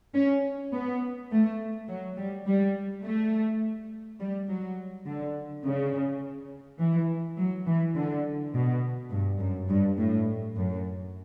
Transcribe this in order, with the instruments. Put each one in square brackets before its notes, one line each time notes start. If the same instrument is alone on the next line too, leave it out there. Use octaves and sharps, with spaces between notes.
[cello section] C#4
B3
A3
F#3
G3
G3
A3
G3
F#3
D3
C#3
E3
F#3
E3
D3
B2
G2
F#2
G2
A2
F#2